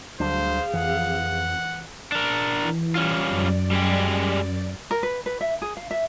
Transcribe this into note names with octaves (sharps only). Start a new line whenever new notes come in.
D2 F#3 G3 D4 G#4 C5 F5
F2 E3 F#5
D4 A#4
E3
G3 C#4 F4 G5 C#6
F#2 D5
G3 G#3 G4
A#4
B4
B4
E5
G#4
F5
E5